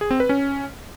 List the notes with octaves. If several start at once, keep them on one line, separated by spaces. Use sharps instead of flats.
G#4
C4
B4
C#4